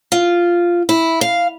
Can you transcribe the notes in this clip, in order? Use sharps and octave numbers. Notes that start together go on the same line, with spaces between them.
F4
E4
F5